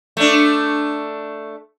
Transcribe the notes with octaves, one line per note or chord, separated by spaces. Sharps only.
A3 D4